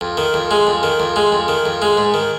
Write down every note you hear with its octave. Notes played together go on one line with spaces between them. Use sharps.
F2
D#3
F2
G#3
F2
D#3
F2
G#3
F2
D#3
F2
G#3
G#2
D#3